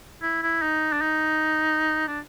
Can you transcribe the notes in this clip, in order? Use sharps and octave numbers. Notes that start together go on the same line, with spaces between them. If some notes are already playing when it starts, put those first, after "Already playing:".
E4
E4
D#4
D4
D#4
D4